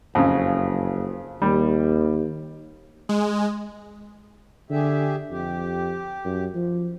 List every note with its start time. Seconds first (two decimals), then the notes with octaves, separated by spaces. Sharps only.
0.15 F#1 F2 C#3
1.42 D#2 G3
3.09 G#3
4.70 D3 G4 G#4 E5
5.31 F2 G4
6.24 F#2
6.55 F3